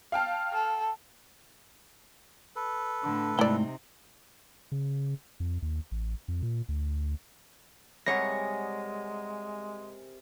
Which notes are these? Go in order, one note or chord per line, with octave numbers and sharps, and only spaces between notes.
F5 G5 A5 F6
A4
A4 B4
A2 D3
G#2 C3 A3 D#4 E4 D5 G5
C#3
F2
D#2
A1
F2
A#2
D2
C3 G3 G#3 G#4 A#4 C#5 F#5 A#6